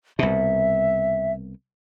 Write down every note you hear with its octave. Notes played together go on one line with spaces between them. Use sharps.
C2 B2 E5